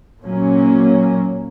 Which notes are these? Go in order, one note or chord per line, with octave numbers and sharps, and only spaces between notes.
A#2 F#3 A#3 C#4